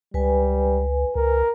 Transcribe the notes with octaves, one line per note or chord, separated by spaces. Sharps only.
C#2 G3 B4 G#5
C#2 A#4